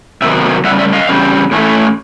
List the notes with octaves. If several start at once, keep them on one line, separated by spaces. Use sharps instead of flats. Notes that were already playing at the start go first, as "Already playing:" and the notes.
C3 D#3 F#3 B3 E5
C#3 E3 G3 E5 F#5
D5 E5
D#5 F5
E2 C#3 G3 C4
A2 E3 A3 C#4 E4